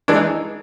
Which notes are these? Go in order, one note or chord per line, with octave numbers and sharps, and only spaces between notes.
E3 G#3 D4
D#4